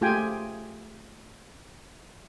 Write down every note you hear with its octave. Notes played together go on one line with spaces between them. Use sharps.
A3 F4 G4 G#4 G5 G#5